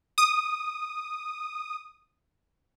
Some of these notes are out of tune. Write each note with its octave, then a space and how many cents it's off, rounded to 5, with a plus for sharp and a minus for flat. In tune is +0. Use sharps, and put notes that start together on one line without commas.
D#6 -10